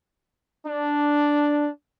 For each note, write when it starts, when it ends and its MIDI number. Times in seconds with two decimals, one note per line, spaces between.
0.66 1.69 62